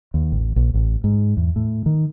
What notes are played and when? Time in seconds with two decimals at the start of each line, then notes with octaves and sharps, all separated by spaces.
0.14 D#2
0.32 A1
0.56 A#1
0.74 A1
1.04 G#2
1.37 E2
1.56 A2
1.86 D#3